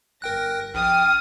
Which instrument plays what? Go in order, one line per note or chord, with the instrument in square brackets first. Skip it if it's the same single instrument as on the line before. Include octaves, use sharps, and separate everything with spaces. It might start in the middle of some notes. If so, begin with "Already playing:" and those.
[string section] G1 A#6 [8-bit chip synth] A#4 G5 F#6
[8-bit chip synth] A#1 [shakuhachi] G5 [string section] D#6 A6 C7 [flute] F6